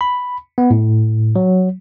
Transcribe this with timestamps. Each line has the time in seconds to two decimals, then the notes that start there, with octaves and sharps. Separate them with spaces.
0.01 B5
0.58 B3
0.70 A2
1.36 F#3